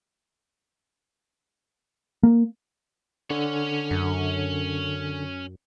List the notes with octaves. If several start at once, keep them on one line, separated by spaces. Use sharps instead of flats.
A#3
D3 C#4 C#5
F#2